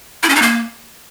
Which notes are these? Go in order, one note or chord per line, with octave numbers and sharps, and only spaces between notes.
E4
C#4
D#4
A#3